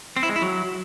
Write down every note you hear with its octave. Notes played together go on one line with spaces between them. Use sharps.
C4
E4
G#3
E4
F#3